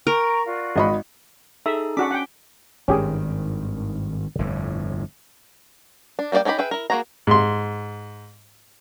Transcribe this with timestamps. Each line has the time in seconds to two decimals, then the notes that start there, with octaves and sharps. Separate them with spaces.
0.07 A#4 G5 A#5 C#6
0.46 F4 F#4 D5
0.76 G#1 D#5 B5
1.66 D#4 G#4 A4 E5
1.97 C#4 D4 F#4 F#5 D6 B6
2.11 F#5 G5
2.88 G#1 G2 D#3 C#4 G4 G#4
4.39 G1 F2 A2
6.19 D4
6.32 G3 A#3 B3 D5 G5
6.45 C#4 D#4 E4 G4 B5
6.58 G#4 B4 E5 G5
6.71 E4 A#4
6.90 A#3 C#4 F#4 G#4 A#5
7.27 G#2 C6